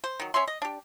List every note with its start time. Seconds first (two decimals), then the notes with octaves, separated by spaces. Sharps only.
0.04 C5
0.20 D#3 F#3
0.34 C#4 C#5 E5 C6
0.48 D#5
0.62 D4 G4